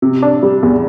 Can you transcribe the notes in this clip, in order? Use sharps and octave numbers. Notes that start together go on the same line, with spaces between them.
C3
D4
G3
E2